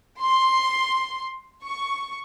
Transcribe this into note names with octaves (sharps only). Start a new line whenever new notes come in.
C6
C#6